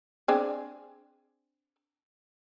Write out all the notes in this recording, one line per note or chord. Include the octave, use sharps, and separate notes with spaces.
C4 D4 G#4